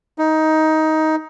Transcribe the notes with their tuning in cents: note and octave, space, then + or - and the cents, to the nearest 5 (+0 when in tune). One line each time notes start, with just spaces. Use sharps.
D#4 +15